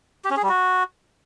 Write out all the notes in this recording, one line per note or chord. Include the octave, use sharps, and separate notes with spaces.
G4
C#4
G#4
G3
F#4